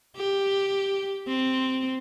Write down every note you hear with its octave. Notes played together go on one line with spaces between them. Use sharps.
G4
C4